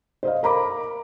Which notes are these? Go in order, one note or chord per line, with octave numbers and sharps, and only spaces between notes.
C5 D#5 F5
A#4 A#5 B5 D6